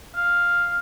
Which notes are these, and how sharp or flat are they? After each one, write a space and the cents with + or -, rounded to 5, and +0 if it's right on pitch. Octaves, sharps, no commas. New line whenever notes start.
F5 +0